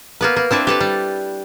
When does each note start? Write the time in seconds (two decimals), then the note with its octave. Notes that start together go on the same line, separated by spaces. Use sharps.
0.21 A#3 B3 B4
0.36 A#3
0.51 C4 D4 E4 B4
0.67 G4 A4 B4
0.80 G3